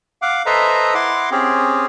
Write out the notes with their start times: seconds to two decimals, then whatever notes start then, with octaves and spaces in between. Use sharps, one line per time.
0.22 F5 F#5 D6
0.46 A4 B4 C5 D#5 E5 A#5
0.94 E4 F#5 C6 D6
1.31 C4 C#4 G4 G#4